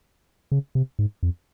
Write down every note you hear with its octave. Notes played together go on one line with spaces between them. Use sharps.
C#3
C3
G#2
F2